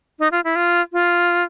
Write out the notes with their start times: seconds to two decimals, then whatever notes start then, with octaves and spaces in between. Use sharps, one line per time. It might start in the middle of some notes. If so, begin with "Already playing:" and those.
0.19 D#4
0.32 F4
0.44 E4
0.56 F4
0.93 F4